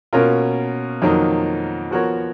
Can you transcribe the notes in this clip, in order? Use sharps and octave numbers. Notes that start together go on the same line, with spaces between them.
B2 A#3 C#4 F4 A#4
F2 D#3 F#3 A#3 D#4
F3 B3 F#4 A#4 C#5